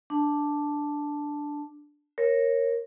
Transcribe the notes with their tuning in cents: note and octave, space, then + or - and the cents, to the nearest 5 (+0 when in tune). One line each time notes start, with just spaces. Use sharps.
D4 +0 A5 +0
A#4 +0 C#5 -15